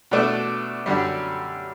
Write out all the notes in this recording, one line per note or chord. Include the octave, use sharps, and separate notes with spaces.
B2 A3 D4
F#2 D3 G3